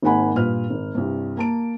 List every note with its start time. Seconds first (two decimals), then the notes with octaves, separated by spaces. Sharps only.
0.02 G#1 G#2 A#3 F#5 G#5 B5
0.35 G2 A#2 B4 F6
0.70 G#1
0.95 C2 G2
1.37 A#3 A5 D7